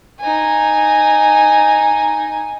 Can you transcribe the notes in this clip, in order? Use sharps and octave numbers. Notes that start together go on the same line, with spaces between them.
D#4 G#5